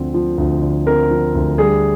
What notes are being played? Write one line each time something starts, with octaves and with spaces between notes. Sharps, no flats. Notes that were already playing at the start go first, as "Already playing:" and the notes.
Already playing: D2 D3 F3 C4
F3
D2
D3
C4 A#4
F3
D2
G3 G#4